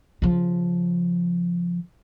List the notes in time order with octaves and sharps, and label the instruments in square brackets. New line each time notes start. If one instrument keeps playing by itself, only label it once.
[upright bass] C#3 F3